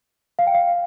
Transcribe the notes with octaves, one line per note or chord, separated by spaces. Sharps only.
F5
G5
F5